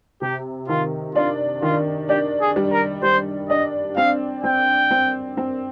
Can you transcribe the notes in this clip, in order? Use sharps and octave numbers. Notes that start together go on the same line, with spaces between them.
C3 G4
D#3 F4
D4 F4
D#3 F4
D4 G4
G#4
G3
A#4
G3 C5
D4 D#5
C4 F5
C4 G5
C4
C4